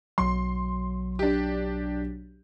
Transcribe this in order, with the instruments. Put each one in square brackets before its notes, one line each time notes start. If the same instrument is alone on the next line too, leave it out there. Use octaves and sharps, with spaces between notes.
[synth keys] B1 F#3 [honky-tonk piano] C6
[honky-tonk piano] D4 G4